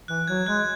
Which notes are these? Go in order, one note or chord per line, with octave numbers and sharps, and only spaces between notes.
E3 F#6
F#3 G#6
G#3 F#6